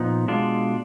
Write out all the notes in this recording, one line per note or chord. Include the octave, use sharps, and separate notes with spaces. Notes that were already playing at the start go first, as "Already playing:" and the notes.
Already playing: A#2 F3 B3 D#4
B2 G#3 D4 F4